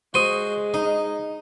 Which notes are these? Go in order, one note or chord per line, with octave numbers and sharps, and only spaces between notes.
G#3 F#4 C5 D#6 D#7 G7
D#4 D#5